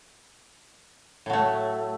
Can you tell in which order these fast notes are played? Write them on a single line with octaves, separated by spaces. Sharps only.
A2 F#3 A3